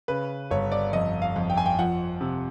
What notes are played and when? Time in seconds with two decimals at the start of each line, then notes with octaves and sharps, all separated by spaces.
0.08 C#3 B4
0.51 G1 C#5
0.72 D5
0.93 F2 D#5
1.22 F5
1.36 F2
1.50 G5
1.57 G#5
1.66 G5
1.79 F3 F#5
2.21 C3